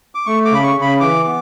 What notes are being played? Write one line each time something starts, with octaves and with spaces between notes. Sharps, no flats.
D6
A3 C#6
D6
C#3 B5
C#6
C#3
B5
E3 D6
B3